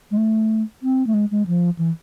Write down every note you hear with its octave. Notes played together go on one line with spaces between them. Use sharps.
G#3
A3
C4
A3
G#3
G#3
F3
E3